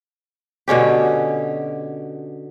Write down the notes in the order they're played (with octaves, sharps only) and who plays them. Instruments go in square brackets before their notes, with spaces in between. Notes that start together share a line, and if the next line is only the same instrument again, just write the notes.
[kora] B2 D3 C#4 G4